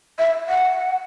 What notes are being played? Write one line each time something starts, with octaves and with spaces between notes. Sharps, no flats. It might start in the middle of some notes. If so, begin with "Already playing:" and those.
E5
F#5